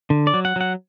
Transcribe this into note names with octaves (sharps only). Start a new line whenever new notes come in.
D3
D5
F#3
F#5
F#3 F#5